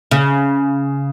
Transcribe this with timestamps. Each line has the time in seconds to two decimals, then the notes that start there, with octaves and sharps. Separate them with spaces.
0.11 C#3